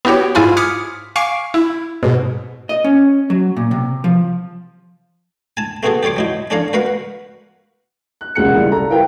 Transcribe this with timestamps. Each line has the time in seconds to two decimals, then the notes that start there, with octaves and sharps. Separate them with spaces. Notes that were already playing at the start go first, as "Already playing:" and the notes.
0.05 B3 E4 F#4 G4 C#5
0.35 G#2 E4 F4 G#5 B5
0.57 D6 D#6 F6 G#6 B6 C#7
1.16 F5 G#5 C#6 D6 C7 D7
1.54 E4
2.03 G#2 B2
2.69 D#5
2.84 C#4
3.30 F#3
3.57 A#2
3.71 C3
4.04 F3
5.57 G#5 A5
5.83 A3 B3 C4 F#4 G#4 A4
6.03 G4 A4 C#5 C6 D6
6.16 F#3 D#4 E4
6.50 C#4 D4 A4 C#5 F5 A#5
6.73 F#4 A#4 B4 F5 F#5
8.21 F#6
8.35 E1 C#2 G#3 F#5 F#6 C#7
8.54 C#2 C#3 E3 G3
8.71 A4 A#5
8.90 E4 G4 A#4 B4 F5 G5